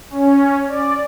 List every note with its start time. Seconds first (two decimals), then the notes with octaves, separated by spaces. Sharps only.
0.10 C#4
0.68 D5